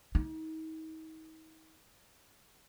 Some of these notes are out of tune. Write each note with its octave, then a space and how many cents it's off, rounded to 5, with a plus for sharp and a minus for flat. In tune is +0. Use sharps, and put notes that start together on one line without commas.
D#4 +40